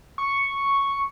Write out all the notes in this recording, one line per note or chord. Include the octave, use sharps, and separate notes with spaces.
C#6